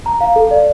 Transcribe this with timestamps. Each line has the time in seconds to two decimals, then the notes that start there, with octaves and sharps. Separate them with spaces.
0.06 A#5
0.21 F5
0.36 A4
0.51 D5